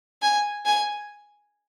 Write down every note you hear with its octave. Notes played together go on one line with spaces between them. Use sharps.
G#5
G#5